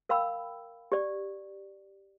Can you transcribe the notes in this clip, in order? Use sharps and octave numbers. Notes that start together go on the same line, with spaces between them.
A#4 F5 G5 B5 E6
G4 D5